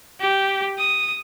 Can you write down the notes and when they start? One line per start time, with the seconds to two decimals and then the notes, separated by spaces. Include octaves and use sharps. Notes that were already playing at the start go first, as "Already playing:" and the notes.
0.20 G4
0.78 D#6